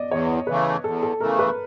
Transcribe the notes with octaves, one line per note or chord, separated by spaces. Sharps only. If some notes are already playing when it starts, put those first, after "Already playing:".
Already playing: D5 D#5
E2 C#5
C#3 E3 A3 B4
E2 A4
A4
C#3 E3 A3 A#4
B4